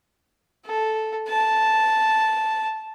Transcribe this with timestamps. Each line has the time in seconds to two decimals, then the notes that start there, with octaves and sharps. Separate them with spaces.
0.66 A4
1.29 A5